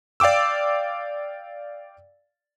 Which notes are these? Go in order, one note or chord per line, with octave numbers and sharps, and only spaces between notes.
D5 F5 G5 D6 E6